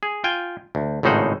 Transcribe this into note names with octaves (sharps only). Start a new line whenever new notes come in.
G#4
F4 G5 G#5
D2
G#1 A2 C#3 D#4 C5 F#5